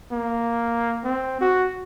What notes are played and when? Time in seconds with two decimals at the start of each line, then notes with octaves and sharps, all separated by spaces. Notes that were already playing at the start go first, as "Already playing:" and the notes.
0.11 A#3
1.04 C4
1.41 F#4